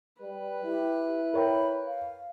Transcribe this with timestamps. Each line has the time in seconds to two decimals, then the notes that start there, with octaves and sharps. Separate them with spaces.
0.22 G3 B4
0.65 E4 G4
1.34 A#4 C#5 G5 B5
1.86 F5